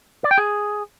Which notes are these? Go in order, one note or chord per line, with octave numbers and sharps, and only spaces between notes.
D5
G5
G#4